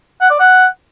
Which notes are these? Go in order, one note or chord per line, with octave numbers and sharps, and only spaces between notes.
F#5
D5
F#5